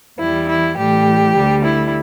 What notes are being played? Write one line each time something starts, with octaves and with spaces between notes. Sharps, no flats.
E2 E3 G3 E4
E4
A2 E3 G3 G4
D2 D3 G3
E4